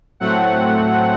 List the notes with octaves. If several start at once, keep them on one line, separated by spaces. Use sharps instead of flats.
A2 F#3 A3 C4 F#5